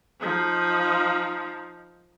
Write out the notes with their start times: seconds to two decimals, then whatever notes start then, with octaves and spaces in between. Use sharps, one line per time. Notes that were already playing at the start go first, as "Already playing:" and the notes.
0.21 F3 D#4